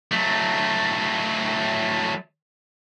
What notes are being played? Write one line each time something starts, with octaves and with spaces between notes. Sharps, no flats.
F#3 A3